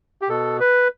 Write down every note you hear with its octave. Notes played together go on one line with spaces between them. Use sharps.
G4
B2 A4
B4